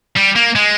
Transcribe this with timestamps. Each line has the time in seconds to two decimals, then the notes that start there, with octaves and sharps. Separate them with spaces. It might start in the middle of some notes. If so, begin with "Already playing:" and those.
0.17 G3
0.36 A#3
0.55 G#3